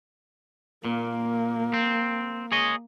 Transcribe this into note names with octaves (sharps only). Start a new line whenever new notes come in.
A#2 A#3
C4
G#4 C#5 D#5